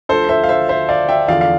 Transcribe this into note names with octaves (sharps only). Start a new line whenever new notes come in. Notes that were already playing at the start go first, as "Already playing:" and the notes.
D2 D3 F3 A4 C5
C5 E5
F5
C5 E5
C5 E5
D5 F5
E5 G5
E2 D3 F3 D5 F5
F5